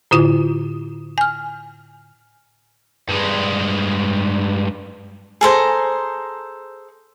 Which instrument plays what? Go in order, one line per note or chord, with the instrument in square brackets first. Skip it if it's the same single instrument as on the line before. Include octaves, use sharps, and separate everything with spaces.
[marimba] A2 D3 E4 F4
G#5 F6
[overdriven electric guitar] G2 G#3
[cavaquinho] G#4 A4 C5 A#5